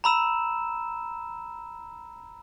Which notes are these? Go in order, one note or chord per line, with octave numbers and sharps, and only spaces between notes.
A#5 B5 E6 E7